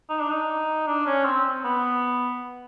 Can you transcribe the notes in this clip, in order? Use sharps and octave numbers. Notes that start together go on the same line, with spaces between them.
D#4
D4
D#4
D4
C#4
C4
B3